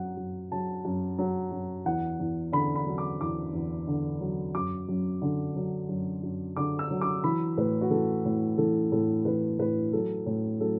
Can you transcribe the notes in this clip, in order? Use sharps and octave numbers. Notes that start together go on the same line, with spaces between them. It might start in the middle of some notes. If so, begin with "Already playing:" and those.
Already playing: F#2 F#3 F#5
F#2
F#3 A5
F#2
F#3
F#2
E2 F#5
E2
D3 B5
B5
F#3
D6
E2 D6
E2
D3
F#3
F#2 D6
F#2
D3
F#3
F#2
F#2
D3 D6
E6
F#3
D6
E3 B5
A2 B4
F#4
E3 A4
A2
E3 A4
A2 A4
E3 B4
A2 B4
F#3 A4
A2
F#3 A4